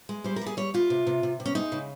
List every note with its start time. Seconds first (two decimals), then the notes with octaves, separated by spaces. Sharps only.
0.09 G#3
0.24 G3 C5
0.36 A#4
0.41 G3 G#4
0.57 G3 C#5
0.74 G3 F4
0.90 C3
1.07 C3
1.23 C3
1.40 C3
1.46 C#4
1.55 G#3 D#4
1.72 C#3